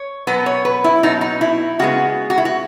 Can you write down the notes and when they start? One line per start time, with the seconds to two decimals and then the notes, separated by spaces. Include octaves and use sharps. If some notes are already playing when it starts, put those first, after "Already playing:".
Already playing: C#5
0.27 B2 F#3 B3 B4
0.46 C#5
0.65 B4
0.84 E4
1.03 B2 F#3 B3 D#4
1.21 D#4
1.41 E4
1.79 C#3 G#3 B3 F#4
2.30 F#4
2.38 E4
2.45 F#4